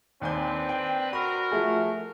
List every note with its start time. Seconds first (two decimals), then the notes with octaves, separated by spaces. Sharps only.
0.21 D#2 C4 D4 B4 G#5 G6
0.69 G5
1.13 F#4 A#4 B5
1.52 F3 A3 G#4